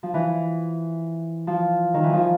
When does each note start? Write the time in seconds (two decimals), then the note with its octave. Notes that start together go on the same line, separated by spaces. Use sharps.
0.03 F3
0.14 E3
1.47 F3
1.94 D#3
2.03 E3
2.13 F3